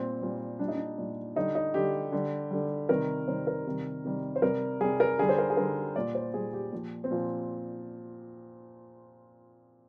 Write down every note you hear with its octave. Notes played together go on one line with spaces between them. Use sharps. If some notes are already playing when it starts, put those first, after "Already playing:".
Already playing: A#2 G3 C4
A#2 G3
A#2 G3 D4
D#4
D4
A#2 G3
D3 G3 D#4
D#4
D3 G3 G4
D3 G3
D3 G3
C3 D#3 G3 A#4
C3 D#3 G3 C5
A#4
C3 D#3 G3
C3 D#3 G3
C5
C3 G3 A#4
C3 G3 G#4
A#4
D3 G3 G#4
C5
A#4
G#4
D3 G3 A#4
A#2 G3 D5
C5
A#2 G3 G#4
G4
A#2 F3
C4
A#2 F3